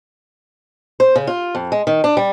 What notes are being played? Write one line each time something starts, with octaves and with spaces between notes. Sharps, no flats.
C5
C#3
F4
F2
G#3
D#3
D4
G3